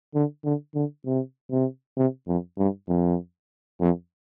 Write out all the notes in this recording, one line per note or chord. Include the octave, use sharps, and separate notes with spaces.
D3
D3
D3
C3
C3
C3
F2
G2
F2
F2